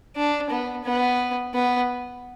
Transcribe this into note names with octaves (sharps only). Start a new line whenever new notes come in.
D4
B3
B3
B3